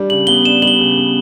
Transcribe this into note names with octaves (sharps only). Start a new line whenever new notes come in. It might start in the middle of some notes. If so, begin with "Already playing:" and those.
Already playing: G3 D4
C#3 F#7
B3 G7
D4 E7
G3 F#7
G7
C#3
B3